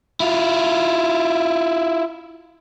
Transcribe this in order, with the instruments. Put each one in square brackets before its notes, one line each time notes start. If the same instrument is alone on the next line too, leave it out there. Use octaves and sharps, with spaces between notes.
[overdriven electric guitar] E4 F4